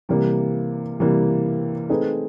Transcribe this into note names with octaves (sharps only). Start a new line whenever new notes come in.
C3 E3 G3 A#3
C3 E3 G3 A#3
A3 C4 D#4 G#4 B4